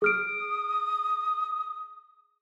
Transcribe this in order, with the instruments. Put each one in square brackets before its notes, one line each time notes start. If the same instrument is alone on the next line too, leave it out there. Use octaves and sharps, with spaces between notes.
[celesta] G#4 F6 D7 [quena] D#6